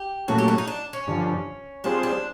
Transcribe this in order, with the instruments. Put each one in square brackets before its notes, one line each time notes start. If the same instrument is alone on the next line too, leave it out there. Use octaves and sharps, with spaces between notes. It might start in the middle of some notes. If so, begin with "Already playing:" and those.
Already playing: [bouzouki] G4
[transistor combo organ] A#2 F#3 A3 C#4 [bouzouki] F#4
[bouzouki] G4
F#4
D#4
D4
C#4
[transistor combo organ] G2 D3 F3
[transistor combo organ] G3 C4 F4 G#4 C5 [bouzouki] D4
[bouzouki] D4